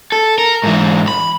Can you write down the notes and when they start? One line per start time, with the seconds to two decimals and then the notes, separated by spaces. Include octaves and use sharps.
0.12 A4
0.38 A#4
0.64 G#2 E3
1.08 B5